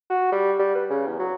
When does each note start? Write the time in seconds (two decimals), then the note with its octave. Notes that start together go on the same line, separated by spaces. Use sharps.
0.10 F#4
0.32 G3
0.59 G3
0.75 B4
0.90 C#3
1.06 E2
1.19 F#3